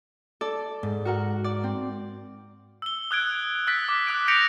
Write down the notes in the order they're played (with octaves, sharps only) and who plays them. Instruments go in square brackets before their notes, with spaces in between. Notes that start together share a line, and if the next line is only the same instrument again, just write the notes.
[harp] A4 D5
[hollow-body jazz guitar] G#2
[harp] F#4 A#4 F#5
D5
C4
[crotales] E6 G7
D#6 F#6 G#6 D7
E6 F#6 A6 B6 D7
D6
D#6 F#6 D7
G6 A#6 B6 C#7 D7 F7